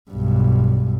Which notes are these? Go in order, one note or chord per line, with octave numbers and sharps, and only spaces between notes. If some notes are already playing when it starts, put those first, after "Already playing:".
B1 G2